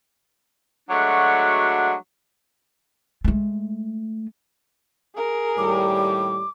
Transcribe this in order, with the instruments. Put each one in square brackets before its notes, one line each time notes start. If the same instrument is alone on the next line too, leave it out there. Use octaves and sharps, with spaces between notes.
[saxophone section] F#3 G#3 A3 D4 F#4
[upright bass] G#3 A3
[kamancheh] G#4 A#4
[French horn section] D#2 A2 G3 [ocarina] D6